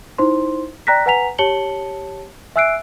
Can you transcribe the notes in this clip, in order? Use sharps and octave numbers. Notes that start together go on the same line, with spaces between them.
D#4 E4 C5 C6
D5 G5 A#5 F#6 A#6 B6
B4 F#5 G#5 A#5 B6 F7
G4 C#5 A5 C#7 F#7 G7
E5 G#5 E6 F#6 C7 D7